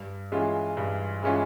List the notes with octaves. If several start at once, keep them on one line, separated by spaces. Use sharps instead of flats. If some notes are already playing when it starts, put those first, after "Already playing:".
Already playing: G2
E3 G#3 C#4 F4
G2
E3 G#3 C#4 F4